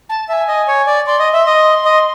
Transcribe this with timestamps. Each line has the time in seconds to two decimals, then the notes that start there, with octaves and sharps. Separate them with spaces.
0.09 A5
0.28 E5 G#5 A5
0.48 D#5
0.68 C#5
0.87 D5
1.06 D5 C6
1.19 D#5
1.33 E5
1.46 D#5
1.85 D#5